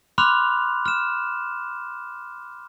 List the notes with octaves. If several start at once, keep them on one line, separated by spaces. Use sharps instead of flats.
B5 C6 D6 F6 F#6 F7
F6 E7